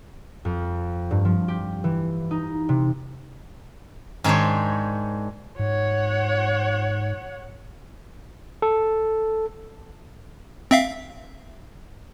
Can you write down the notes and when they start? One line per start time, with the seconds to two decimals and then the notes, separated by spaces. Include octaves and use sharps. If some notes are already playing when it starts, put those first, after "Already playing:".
0.45 F2
1.11 G2
1.25 F3
1.48 G4
1.84 E3
2.31 D#4
2.69 C3
4.24 G#2 D#3 D4 C5 C#5
5.59 G#2 C#5 F#5
8.62 A4
10.71 C4 E5 F5